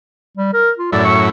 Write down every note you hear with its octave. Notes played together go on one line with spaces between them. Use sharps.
G3
A#4
F4
F#2 A2 E4 D5
C#6